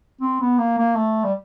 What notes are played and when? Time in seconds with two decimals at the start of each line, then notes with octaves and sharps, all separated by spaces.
0.21 C4
0.41 B3
0.58 A#3
0.78 A#3
0.96 A3
1.24 G3